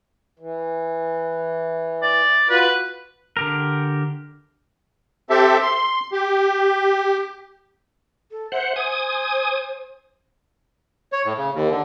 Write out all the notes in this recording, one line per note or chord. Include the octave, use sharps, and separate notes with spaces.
E3
D5
F4 F#4 B4
D3 G4 A#4
C4 G4 A4 E5
C6
G4
A4
C5 E5 F#5
C5 G#5 D#6
C#5
A2
C#3
D#2
D3